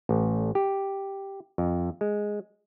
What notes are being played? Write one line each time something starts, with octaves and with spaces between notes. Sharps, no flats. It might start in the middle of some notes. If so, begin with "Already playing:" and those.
A1
G4
F2
G#3